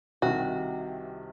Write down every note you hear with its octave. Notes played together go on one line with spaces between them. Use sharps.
C2 C3 D#3 F#4